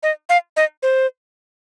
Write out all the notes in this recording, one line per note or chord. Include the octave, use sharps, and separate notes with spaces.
D#5
F5
D#5
C5